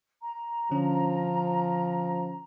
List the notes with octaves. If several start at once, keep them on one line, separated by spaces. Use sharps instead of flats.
A#5
D3 F3 C#4